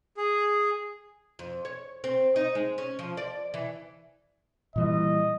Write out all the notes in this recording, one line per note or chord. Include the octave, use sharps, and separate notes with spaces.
G#4
F2
C#5
C4
D#4
G#3
C#4
F3
D5
E3
A#2 E3 G3 D#5